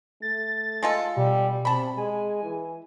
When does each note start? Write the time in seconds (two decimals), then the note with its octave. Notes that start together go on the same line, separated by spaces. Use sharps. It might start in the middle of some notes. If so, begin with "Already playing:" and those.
0.22 A3 A6
0.82 G#3 F4 A4
1.17 B2 G3
1.65 C3 A5 B5
1.97 G#3 G#5
2.43 E3